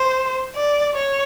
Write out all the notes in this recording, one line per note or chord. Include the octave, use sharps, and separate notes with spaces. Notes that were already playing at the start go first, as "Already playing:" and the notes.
Already playing: C5
D5
C#5